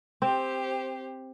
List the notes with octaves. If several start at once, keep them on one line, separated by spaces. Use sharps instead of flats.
C4 G4 C5